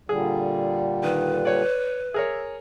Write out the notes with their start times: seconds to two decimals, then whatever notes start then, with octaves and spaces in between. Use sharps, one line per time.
0.09 A#2 D3 G3 G#4
1.03 D#3 B4
1.45 C#5 D5
2.14 G#4 A#4 C#5 E5